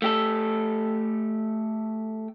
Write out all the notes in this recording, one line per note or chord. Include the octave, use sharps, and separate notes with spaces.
A3 G4 A4